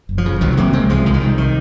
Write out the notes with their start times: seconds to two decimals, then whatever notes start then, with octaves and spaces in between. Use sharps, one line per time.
0.09 F#1
0.18 F3
0.26 C#3
0.41 C2 D#3 F#3
0.57 C3 F#3 A#3
0.73 C3 G#3 C4
0.89 C2 F3 G#3
1.06 C2
1.14 D#3
1.21 C3
1.38 D#3